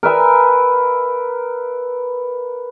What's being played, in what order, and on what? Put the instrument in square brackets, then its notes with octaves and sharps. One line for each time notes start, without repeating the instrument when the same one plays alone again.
[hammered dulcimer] A#4 B4 E5 G#5